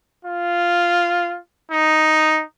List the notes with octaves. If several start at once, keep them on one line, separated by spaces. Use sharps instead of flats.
F4
D#4